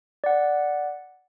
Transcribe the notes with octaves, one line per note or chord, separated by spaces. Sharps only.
D5 F#5